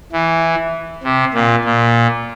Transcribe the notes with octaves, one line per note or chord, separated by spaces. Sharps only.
E3
C3
A#2
A#2